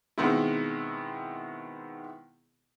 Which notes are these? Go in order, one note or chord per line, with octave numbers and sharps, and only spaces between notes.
B2 D#3 G#3 B3 C4 E4